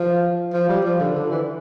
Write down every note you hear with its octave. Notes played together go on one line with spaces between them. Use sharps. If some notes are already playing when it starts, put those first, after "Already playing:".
Already playing: F3
F3
G3
F3
D3
D3
E3